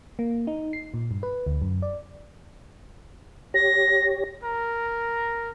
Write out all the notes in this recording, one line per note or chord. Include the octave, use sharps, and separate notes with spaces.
A#3
D#4
C7
A#2
G2
B4
D2
F#2
D5
G4 C#5 A#6
A#4